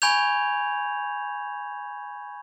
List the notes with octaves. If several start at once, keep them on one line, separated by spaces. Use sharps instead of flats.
G#5 B5 C#6 G6 G#6 F7